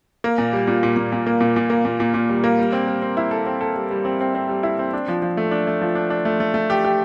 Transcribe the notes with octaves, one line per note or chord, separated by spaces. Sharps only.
A#3
A#2
G3
A#2
A#2
A#2
A#2
A#3
A#2
A#2
A#3
A#2
A#2
A#2
G3
A#3
G3
C4
G3
C4
E4
A4
C4
A4
G3
G3
C4
C4
C4
G3
E4
C4
D4
F3
F3
A3
D4
A3
F3
D4
D4
A3
A3
A3
G4
G4